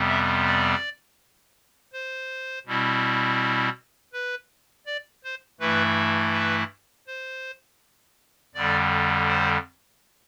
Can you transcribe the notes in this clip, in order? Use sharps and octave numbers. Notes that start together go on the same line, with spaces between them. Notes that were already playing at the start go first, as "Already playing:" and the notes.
Already playing: F2 C3 G3 B3
E5
D5
C5
B2 G3 C4 E4
B4
D5
C5
G2 E3 A3 E4 B4
B4
C5
F2 D3 G3 D5
C5